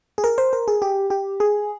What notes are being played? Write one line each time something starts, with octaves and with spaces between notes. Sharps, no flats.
G#4
A#4
C5
A#4
G#4
G4
G4
G#4